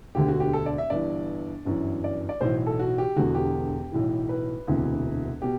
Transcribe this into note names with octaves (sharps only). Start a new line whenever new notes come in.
E1 D2 D3 G4
F#4
G4
A4
D5
E5
G1 G2 E3 D5
G1 F#2 E3
D5
D5
B1 A2 E3 C5
A4
F#4
G4
E1 E2 D3 F#4
G4
B1 A2 E3
B4
E1 D2 C3 E3
B2 G4